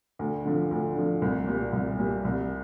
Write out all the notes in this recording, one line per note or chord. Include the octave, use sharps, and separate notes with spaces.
D2
D3 F3
D2
D3 F3
C2
A#2 G3
C2
A#2 G3
C2